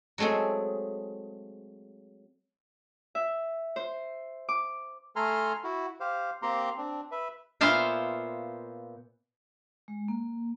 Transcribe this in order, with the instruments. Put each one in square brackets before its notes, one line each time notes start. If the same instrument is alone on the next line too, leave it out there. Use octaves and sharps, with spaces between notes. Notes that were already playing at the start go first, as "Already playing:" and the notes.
[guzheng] F#3 G#3 A3 C4 G#4
[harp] E5
C5
D6
[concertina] A3 A4 G#5 A#5 C6 F6
E4 F#4
G4 C5 F5
A#3 C4 G4 A#5 C6
C4 D4
B4 E5
[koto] A#2 B3 C5 E5 F5 G5
[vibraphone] G#3
A#3